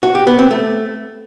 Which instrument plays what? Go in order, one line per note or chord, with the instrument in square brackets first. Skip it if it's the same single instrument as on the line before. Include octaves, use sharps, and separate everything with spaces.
[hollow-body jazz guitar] F#4
G4
B3
C4
A3